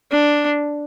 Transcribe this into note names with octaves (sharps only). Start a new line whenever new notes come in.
D4